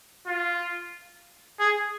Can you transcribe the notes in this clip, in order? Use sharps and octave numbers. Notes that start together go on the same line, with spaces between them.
F4
G#4